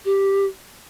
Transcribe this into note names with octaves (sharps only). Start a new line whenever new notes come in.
G4